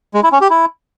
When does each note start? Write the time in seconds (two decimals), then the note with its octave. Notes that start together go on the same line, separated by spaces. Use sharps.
0.14 G#3
0.23 E4
0.32 C#4
0.41 G4
0.50 E4